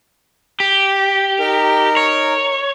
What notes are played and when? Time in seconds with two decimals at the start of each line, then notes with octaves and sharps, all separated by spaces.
0.60 G4
1.40 D#4 A#4
1.97 C#5